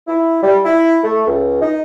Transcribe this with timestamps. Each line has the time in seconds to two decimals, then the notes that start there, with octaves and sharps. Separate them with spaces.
0.08 E4
0.42 G3
0.65 E4
1.03 A3
1.27 C#2
1.61 D#4